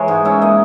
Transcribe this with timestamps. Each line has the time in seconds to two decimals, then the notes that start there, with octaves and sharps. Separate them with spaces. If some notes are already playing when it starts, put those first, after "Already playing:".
Already playing: E3 G#3 A#4 C#5
0.08 G#2
0.25 C#4 E5
0.42 A#3 D#5